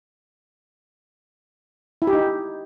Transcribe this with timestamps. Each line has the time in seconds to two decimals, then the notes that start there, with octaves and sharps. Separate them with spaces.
2.02 E4
2.07 G4
2.13 D#4